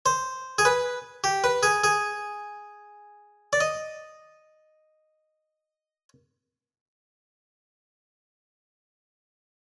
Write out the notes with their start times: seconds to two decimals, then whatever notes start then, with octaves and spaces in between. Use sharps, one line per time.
0.06 C5
0.58 G#4
0.65 B4
1.24 G4
1.44 B4
1.63 G#4
1.84 G#4
3.53 D5
3.61 D#5